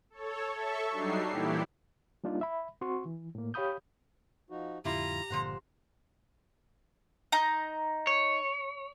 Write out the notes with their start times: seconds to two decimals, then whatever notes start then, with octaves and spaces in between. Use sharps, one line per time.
0.10 A4 C#5
0.53 A4 E5 C#6
0.90 F#3 G3 D4 D#4 C7
1.28 A#2 E3 E4 G4
2.24 G3 A#3 D4 D#4 F4
2.41 E5 B5
2.81 C4 F#4 C6 C#6
3.06 E3
3.35 A2 A#3
3.54 G4 C#5 F5 B5 D#6 G6
4.50 F3 D#4 F#4
4.85 F2 A2 D3 G3 E4 F4 G4 A#5
5.30 G1 A#2 D3 F3 C5 F#5
7.32 D#4 A#5
8.07 C#5